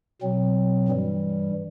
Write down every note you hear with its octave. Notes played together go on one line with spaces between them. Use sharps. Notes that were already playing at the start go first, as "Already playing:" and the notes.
B2 F#3 C4
G2 E3 G3